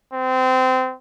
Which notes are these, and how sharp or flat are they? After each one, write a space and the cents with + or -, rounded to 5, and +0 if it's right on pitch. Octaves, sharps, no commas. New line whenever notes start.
C4 -25